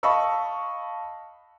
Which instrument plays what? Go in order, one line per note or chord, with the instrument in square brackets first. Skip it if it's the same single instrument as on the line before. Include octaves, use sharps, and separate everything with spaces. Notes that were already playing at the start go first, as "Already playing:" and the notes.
[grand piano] D#5 F5 A5 B5 C#6 E6